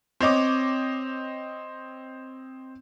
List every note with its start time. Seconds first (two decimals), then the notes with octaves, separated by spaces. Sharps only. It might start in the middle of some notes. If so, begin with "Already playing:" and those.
0.20 C4 C#5 D#5 D6